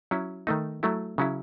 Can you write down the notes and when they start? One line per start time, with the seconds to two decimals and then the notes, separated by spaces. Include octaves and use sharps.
0.11 F#3 C#4 E4
0.47 D#3 A3 D#4
0.83 F#3 A3 E4
1.18 C#3 F#3 C#4 E4